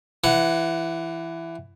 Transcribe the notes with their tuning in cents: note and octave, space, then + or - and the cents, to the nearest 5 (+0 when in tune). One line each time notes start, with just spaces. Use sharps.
E3 +15 F#5 +0